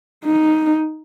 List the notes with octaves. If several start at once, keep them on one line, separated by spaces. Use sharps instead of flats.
D#4